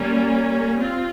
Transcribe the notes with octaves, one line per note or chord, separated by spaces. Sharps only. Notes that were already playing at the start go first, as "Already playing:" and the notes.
Already playing: G3 A#3 C#4
C4 F4